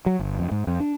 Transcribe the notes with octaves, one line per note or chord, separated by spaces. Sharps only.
F#3
G1
F2
G#2
F2
D4